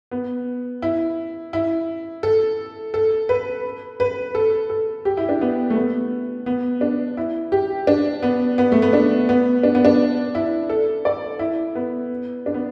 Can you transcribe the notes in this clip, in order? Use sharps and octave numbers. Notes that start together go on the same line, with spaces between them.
B3
E4
E4
A4
A4
B4
B4
A4
A4
G4
E4
D4
B3
A3
B3
B3
D4
E4
G4
D4
B3
B3
A3
B3
D4
B3
D4
B3
D4
E4
A4
D5
E4
B3
D4
B3